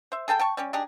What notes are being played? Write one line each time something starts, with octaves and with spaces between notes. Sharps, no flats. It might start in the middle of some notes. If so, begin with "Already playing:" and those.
C5 E5
G#4 A4 G5 A5
G5 A5 C#6
G3 C#4 G4
D4 D#4 G4 G#4